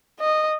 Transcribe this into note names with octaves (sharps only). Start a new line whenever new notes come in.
D#5